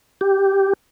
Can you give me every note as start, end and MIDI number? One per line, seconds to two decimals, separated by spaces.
0.21 0.73 67